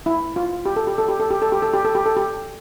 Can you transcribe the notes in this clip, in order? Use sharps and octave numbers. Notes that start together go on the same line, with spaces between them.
E4
F4
G4
A4
G4
A4
G4
A4
G4
A4
G4
A4
G4
A4
G4
A4
G4